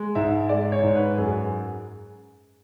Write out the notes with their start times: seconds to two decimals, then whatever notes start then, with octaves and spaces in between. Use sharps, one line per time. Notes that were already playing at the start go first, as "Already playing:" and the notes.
Already playing: G#3
0.15 G#2 E5
0.49 G#3 D5
0.72 C#5
0.83 G#2
0.96 B4
1.18 F#2 G#4